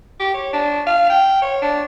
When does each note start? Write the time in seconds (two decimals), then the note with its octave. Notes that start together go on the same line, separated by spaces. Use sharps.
0.20 G4
0.34 C#5
0.53 D4
0.87 F5
1.10 G5
1.42 C#5
1.62 D4